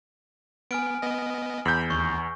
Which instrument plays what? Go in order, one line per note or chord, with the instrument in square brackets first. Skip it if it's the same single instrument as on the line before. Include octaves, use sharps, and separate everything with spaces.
[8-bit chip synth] B3 [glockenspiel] G#5 F6 D7
[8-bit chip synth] B3 D#5
[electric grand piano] E2 G6 [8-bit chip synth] B5
[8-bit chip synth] D#2 [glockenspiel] C#6